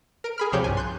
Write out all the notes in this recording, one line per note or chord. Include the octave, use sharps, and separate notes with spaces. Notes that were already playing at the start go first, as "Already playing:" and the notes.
A#4 D7
G#4 B5 F6
C#2 C3 F3 G4 C#5 G6
C2 G2 G#5
C6 F#6 G6